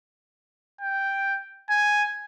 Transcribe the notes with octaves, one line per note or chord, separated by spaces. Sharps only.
G5
G#5